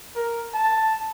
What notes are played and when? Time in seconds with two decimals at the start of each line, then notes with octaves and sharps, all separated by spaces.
0.15 A#4
0.54 A5